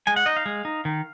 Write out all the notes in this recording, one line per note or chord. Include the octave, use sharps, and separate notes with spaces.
G#3 G#5
F#5
D#4 D#5
F5
G#3
D#4
D#3